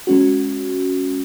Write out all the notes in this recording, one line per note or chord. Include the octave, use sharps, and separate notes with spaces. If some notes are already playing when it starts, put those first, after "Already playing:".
G#3 C#4 F#4